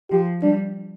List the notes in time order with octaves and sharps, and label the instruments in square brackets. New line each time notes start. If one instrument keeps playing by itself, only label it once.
[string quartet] F3 [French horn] G4
[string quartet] G3 [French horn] D4